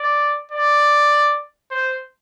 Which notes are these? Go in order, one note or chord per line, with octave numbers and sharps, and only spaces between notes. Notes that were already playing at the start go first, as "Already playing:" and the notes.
Already playing: D5
D5
C5